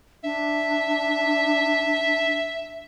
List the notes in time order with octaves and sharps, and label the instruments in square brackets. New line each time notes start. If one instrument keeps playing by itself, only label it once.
[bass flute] D4 [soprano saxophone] E5